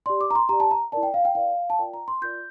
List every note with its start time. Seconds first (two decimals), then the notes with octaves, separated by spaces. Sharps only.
0.06 G4 D5 C6
0.21 D6
0.31 A#5
0.35 C6
0.49 G4 D5 A#5
0.60 A5
0.71 A#5
0.92 E4 A#4 D5 A5
1.03 G5
1.14 F5
1.25 G5
1.35 E4 A#4 D5 F5
1.70 A5
1.79 F4 A#4 D5 G5
1.94 A#5
2.08 C6
2.22 F4 A#4 D5 G6